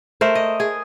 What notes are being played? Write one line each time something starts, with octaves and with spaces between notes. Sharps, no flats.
A3 A#4 C5
D#5
G#4